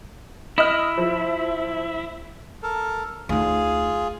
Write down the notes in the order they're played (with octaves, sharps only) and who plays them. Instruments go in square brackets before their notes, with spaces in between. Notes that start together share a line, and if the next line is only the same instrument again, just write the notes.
[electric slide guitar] E4 [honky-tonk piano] D#5 F6
[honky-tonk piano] F3
[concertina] A4 A#4
[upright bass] D2 D#4 [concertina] F4 G#4